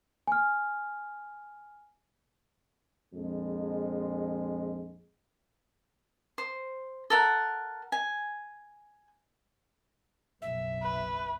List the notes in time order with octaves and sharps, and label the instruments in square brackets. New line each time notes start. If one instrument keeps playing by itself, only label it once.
[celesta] G#5 F6
[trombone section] A#1 F2 G#3
[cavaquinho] C5
A4 A#4 F#5
G#5
[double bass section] F#1 B1 [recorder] E5
[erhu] B4